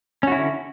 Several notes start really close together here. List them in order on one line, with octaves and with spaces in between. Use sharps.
C#4 F#4 E4 D3